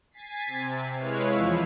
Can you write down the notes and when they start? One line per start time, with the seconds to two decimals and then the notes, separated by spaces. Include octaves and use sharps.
0.11 G#5 A6 B6 C7
0.47 C3
0.96 G#3 E4 B4 C#5 F5
1.32 E2 F3 E4 C7